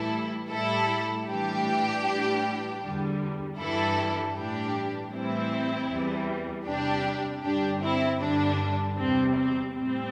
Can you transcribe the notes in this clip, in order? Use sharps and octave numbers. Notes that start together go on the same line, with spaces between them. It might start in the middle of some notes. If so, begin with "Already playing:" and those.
Already playing: A2 E3 G3 E4 A4
A2 G3 E4 A4
A2 E3 G3 D4 G4
A2 E3 G3
E2 D3 G3
G2 E3 G3 E4 A4
A2 E3 G3 D4 G4
A2 E3 G3 C4 E4
E2 E3 G3
E2 C3 G3 D4 G4
G2 D3 G3 D4 G4
C4 E4
G2 D3 G3 D4
E2 C3 G3 C4
C4
A2 G3 C4